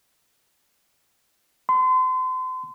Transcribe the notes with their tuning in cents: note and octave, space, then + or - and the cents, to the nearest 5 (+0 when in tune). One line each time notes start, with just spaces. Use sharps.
C6 -35